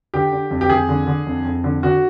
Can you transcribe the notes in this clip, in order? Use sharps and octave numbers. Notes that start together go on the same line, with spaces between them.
D3 G4
D3
F2
G4
F2 G#4
D3
D3
F2
F2
D3
D3 F#4